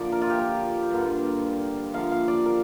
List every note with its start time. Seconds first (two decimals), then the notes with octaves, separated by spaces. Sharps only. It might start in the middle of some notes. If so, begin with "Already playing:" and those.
Already playing: D3 F3 A#3 D5
0.12 A#4
0.22 F4
0.30 G4
0.39 A#4
0.91 G2 D3 A#3
1.94 D3 F3 A#3 F5
2.11 F5
2.28 D5
2.46 A#4